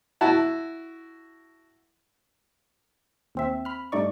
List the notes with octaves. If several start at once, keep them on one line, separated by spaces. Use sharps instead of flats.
E4 F#4 A5
D#2 C4 E5
B5 F6
G2 A3 D#4 D5 C#6